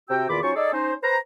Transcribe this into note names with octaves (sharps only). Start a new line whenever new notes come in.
C3 F#4 G5 E6
E2 A#2 D#3 F4 B5 D6
F#3 C#4 D#4 F4 C5 C#6
D#4 G#4 A4 D5
C#4 D#4 C5
B4 C5 A#5